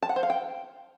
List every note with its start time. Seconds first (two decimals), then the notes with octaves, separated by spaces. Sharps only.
0.02 A5
0.09 F#5
0.16 C5
0.23 F5
0.30 G5